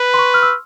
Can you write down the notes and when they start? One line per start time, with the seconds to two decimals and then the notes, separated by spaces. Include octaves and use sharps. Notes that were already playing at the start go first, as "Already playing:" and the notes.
Already playing: B4
0.14 C6
0.19 C#6
0.34 F6
0.42 E6